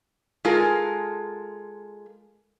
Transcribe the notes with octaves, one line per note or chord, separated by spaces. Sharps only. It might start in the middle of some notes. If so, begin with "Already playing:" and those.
G#3 F4 A4 A#4